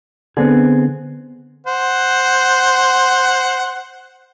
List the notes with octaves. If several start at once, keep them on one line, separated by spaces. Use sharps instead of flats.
D3 B3 C4 G#4
C5 F#5